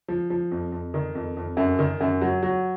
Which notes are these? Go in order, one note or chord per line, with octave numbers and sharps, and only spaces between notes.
F3
F3
F2
F2
D#3
F2
F2
F#2
D#3
F#2
F#3
F#3